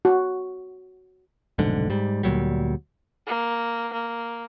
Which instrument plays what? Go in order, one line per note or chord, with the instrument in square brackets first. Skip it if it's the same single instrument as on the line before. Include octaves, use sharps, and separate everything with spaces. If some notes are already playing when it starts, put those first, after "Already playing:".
[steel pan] F#4
[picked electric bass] F1 B1 G#2 D3
G#2 G3
D2 A#2 F#3 G3
[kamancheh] A#3
A#3